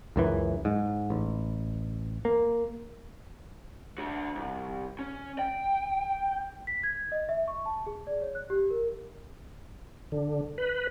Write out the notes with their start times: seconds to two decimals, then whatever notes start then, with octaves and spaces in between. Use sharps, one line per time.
0.16 C#2 F#2 E3
0.65 G#2
1.10 A1
2.25 A#3
3.98 D4 F#4
4.35 C2
4.99 C#4
5.39 G5
6.67 B6
6.83 G#6
7.12 D#5
7.29 E5
7.48 C#6
7.66 A5
7.87 G#4
8.07 D5
8.22 C#5
8.35 F#6
8.50 G4
8.70 A#4
10.12 D3
10.58 B4